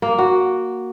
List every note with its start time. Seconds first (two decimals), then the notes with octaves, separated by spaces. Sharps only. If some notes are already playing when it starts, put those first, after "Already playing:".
0.02 A#3
0.18 F#4